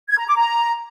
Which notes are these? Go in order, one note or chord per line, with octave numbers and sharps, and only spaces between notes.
G#6
A#5
D6
A#5